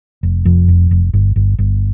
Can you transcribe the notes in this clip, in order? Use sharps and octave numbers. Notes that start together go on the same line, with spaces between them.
F1
F2
F1
F1
G1
G1
G1